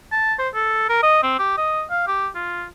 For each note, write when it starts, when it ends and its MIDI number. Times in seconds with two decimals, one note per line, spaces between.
0.12 0.34 81
0.39 0.49 72
0.54 0.87 69
0.89 1.02 70
1.03 1.21 75
1.23 1.35 60
1.39 1.56 67
1.57 1.83 75
1.91 2.05 77
2.07 2.28 67
2.35 2.66 65